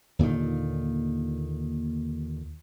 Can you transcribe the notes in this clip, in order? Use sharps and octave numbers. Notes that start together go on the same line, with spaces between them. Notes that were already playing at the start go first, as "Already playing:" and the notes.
D#2 A#2 D3 D#3